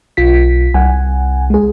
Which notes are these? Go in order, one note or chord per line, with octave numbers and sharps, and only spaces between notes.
B1 F4 B6
C2 F#5 G#5
G#3 G#4